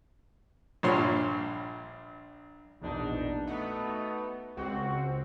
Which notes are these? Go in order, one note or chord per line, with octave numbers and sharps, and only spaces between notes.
A#1 G2 A#2 C#5 C6
A#1 E2 B2 D4 D#4
A3 B3 D#4 F#4
C#2 C4 F#4